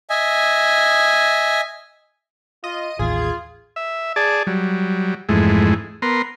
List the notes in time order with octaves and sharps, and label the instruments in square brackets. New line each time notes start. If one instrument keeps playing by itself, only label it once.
[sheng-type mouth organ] D#5 E5 G#5
[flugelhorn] F4 [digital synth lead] D#5
[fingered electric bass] A1 D#2 [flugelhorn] F4 [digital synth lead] G#4
[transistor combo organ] E5
G#4 D5 A5
F#3 G3
F2 G#2 E3 G#3 A3
B3 A#4 C6